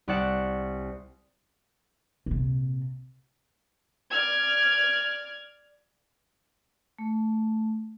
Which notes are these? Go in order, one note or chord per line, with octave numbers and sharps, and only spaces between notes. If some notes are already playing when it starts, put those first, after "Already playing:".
C2 D5 F#5 E7
A#1 C3
D5 F6 G#6
A3